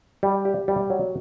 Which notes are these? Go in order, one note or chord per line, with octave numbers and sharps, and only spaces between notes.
G3
G4
G3
F#3